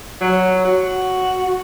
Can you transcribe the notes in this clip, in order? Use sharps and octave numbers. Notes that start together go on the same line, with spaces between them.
F#3
F#4